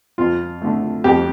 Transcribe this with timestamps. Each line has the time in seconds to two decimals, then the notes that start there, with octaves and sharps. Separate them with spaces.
0.18 F2 F4
0.62 D3 A3
1.04 F2 G4